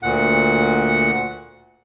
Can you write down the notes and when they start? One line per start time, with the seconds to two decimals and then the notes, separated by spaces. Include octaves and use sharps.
0.03 D2 A#2 F#5